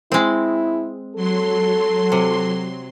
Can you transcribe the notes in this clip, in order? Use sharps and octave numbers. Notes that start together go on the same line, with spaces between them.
G#3 C4 E4
F#3 A4 C6
C3